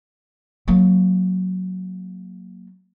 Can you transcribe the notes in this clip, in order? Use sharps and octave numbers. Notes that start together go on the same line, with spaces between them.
F#3 A#3